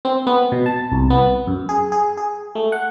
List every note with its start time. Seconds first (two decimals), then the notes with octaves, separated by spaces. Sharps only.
0.05 C4
0.27 B3
0.52 B2
0.66 A5
0.92 C2
1.10 B3
1.47 F#2
1.69 G#4
1.92 G#4
2.17 G#4
2.55 A3
2.72 F#5